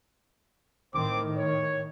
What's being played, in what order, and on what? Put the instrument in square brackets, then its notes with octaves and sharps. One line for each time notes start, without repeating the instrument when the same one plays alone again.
[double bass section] A2 D#3 [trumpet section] C4 C5 D6
[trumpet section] C#5